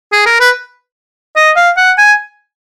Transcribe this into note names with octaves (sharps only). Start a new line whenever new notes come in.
G#4
A#4
B4
D#5
F5
F#5
G#5